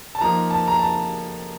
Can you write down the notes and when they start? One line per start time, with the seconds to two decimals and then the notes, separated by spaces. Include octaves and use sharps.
0.15 A5
0.21 F3 A#3 D#4 A#5
0.50 A5
0.68 A#5
0.79 A5